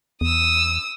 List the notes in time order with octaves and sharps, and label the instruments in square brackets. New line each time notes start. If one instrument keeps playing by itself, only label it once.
[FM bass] E2 [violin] D#6 E6